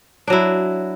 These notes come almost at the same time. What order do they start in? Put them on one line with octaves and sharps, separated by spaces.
D4 F#3 E4